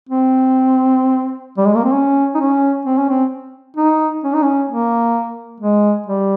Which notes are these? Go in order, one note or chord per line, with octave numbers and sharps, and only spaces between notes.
C4
G3
G#3
A#3
C4
C#4
D#4
C#4
C4
C#4
C4
D#4
C#4
D#4
C#4
A#3
G#3
G3